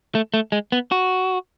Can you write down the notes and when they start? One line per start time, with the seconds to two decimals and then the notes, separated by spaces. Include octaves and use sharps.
0.15 A3
0.34 A3
0.52 G#3
0.72 B3
0.92 F#4